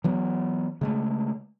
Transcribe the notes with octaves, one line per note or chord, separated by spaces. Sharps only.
E3 F#3 B3
C#3 G#3 A3